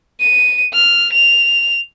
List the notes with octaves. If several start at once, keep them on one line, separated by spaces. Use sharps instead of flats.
D#7
F6
F7